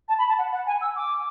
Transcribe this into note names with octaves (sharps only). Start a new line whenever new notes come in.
A5
B5
A5
F#5
F#5
G#5
E6
D6